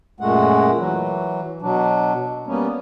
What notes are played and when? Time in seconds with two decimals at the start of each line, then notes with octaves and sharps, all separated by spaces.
0.20 F#2 A#2 G#3 A3 F#5
0.77 E3 F#3
1.62 B2 F#3 D4
2.47 G3 A#3 B3 C#4